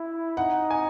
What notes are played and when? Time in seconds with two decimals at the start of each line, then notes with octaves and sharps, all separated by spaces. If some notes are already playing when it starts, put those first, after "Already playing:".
Already playing: E4
0.37 D#4 F#5
0.71 G#5